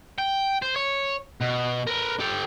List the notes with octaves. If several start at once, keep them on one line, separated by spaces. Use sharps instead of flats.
G5
C5
C#5
B2
A#4 B4
G4 A4